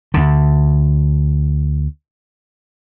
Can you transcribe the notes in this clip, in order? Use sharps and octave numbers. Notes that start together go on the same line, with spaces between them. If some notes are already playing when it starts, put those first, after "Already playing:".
D2 D3